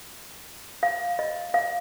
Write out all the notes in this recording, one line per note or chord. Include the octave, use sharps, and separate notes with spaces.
F5
D#5
F5